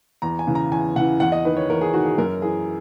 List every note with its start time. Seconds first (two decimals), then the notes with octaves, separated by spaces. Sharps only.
0.22 E2 A#5
0.39 G#5
0.47 C#3 E3
0.55 A#5
0.72 E2 G#5
0.96 C#3 E3 F#5
1.20 E2 F#5
1.32 D#5
1.45 D#3 B4
1.57 C#5
1.69 E2 A#4
1.81 G#4
1.94 D#3 F#4
2.06 G#4
2.18 F#2 A#4
2.42 E3 G#4